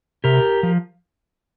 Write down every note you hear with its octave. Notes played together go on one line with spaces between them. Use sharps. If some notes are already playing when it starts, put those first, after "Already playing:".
C3 G4 A#4
F3